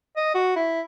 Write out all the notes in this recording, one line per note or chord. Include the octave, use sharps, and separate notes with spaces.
D#5
F#4
E4